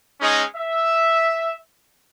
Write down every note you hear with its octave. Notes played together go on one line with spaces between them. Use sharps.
G#3 C#4 D#4 G#4
E5